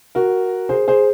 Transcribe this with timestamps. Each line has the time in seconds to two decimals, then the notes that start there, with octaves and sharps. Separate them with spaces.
0.15 F#4 A#4
0.69 G#4 C5
0.88 G#4 C5